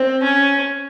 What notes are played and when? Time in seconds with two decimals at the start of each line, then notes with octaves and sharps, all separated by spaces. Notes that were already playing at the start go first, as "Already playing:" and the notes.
Already playing: C4
0.23 C#4